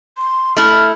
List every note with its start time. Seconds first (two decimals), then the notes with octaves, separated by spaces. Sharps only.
0.17 C6
0.57 A3 E4 F6